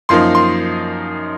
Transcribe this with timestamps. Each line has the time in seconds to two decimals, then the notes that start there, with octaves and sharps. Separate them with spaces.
0.09 F#2 F3 A#3 D#4 C6
0.35 C6